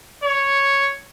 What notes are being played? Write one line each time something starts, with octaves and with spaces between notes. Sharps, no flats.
C#5